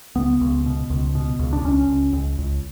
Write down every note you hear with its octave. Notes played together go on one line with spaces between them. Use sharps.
C#2 B3
C#2
B2
C#2
B2
C#2
D4
C#2 C#4
C#2
C#2
C#2